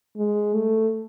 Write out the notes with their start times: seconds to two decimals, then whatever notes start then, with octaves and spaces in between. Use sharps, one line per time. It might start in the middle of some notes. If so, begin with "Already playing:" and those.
0.17 G#3
0.54 A3